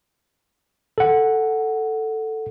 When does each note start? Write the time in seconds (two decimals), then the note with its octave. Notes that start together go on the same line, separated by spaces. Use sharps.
0.98 A4 F#5